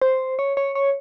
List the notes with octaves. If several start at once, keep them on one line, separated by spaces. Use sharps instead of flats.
C5
C#5
C#5
C#5